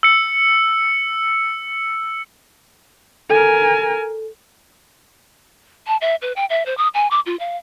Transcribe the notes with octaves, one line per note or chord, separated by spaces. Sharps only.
E6 C#7
A4 A#4 G#5
A5
E5
B4
G5
E5
C5
D#6
G#5
D6
F4
F5